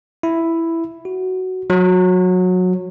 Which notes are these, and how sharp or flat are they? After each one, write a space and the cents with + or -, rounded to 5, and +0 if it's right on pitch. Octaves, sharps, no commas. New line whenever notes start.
E4 +5
F#4 +10
F#3 -20